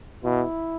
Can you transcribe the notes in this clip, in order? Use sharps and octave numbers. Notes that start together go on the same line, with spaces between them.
B2 E4